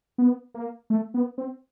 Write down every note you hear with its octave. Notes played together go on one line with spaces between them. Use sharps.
B3
A#3
A3
B3
C4